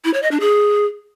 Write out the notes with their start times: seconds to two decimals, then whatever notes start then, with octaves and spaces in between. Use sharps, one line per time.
0.05 E4
0.14 C#5
0.22 D#5
0.31 D4
0.40 G#4